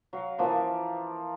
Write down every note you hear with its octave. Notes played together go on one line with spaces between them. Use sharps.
F#3 F5
E3 F3 A#3